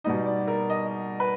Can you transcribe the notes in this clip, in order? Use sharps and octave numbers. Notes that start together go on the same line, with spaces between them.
B2 G3 B3 D#4 D#5
D5
A#4
D#5
B4